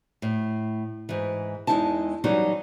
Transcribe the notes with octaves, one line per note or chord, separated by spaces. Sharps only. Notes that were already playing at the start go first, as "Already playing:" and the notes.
A2
G#2 E3
E2 A#2 G#3 D#4 E4 A5
E3 F#3 G3 C#4 D#4 F#4